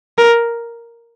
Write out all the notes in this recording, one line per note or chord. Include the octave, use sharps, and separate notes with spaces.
A#4